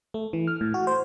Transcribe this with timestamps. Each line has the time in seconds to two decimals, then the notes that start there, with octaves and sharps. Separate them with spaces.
0.14 A3
0.33 E3
0.47 F6
0.61 A2
0.74 F#4
0.87 C5